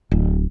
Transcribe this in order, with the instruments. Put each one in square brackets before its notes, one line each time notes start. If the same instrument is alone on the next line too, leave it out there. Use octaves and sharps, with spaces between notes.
[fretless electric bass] D1